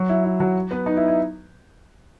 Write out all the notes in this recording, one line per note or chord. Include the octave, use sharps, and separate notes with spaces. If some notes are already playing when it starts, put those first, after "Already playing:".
Already playing: F#3 F#4
E4
E4
F#3 F#4
B3 B4
D#4
E4
E4